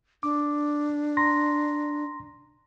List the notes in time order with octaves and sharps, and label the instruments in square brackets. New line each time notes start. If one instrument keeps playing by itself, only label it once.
[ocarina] D4 [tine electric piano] D6
[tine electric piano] A#5 C6 A#6